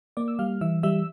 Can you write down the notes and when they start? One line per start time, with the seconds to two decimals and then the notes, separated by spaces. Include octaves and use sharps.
0.17 A#3 D5 D6
0.28 E6
0.39 G3 F5 F6
0.61 E3 E5 E6
0.83 G3 E5 E6